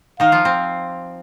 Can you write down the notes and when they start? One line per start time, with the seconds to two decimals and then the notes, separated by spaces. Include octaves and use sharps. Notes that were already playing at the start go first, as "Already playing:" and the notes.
0.20 D#3 D#4 F5
0.32 F3 F4
0.45 C4